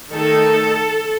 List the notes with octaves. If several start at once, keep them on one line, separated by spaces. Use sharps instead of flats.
D#3 A3 D#4 A4